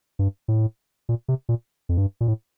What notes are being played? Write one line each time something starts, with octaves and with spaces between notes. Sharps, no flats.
G2
A2
A#2
C3
A#2
F2
G2
A#2
A2